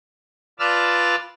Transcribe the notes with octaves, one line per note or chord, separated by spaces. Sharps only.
F4 B4 D5 A5 E6 F6